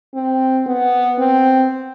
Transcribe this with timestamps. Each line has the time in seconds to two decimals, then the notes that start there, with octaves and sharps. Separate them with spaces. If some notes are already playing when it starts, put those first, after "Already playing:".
0.15 C4
0.67 B3
1.19 C4